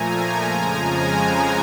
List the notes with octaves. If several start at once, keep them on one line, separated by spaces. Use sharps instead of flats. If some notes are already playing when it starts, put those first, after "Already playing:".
Already playing: A#2 F3 A3 G#5 A#5
F2 C#3 F3 G#3
G#5 A#5